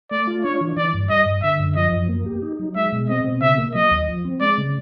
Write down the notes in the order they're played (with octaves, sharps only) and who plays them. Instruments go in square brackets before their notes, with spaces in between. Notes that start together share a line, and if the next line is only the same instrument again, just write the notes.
[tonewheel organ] A3 [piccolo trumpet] D5
[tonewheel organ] F4
[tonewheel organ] D4 [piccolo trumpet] C#5
[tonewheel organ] E3
[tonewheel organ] E3 [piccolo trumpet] D5
[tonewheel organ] G2
[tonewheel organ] G3 [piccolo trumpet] D#5
[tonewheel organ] G2
[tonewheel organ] D3 [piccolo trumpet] E5
[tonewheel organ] F#2
[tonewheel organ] F3 [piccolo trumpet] D#5
[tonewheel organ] F#2
A#3
G4
D#4
F#3
[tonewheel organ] G#3 [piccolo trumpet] E5
[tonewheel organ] B2
[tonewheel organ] C4 [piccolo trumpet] D#5
[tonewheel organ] B2
[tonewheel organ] C#3 [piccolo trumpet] E5
[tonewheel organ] A#3
[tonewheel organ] F#3 [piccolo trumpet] D#5
[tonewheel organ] D#2
F3
C4
[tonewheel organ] G#3 [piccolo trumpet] D5
[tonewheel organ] C#3